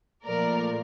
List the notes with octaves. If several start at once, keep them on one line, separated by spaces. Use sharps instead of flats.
A#2 F3 A3 A#4 D5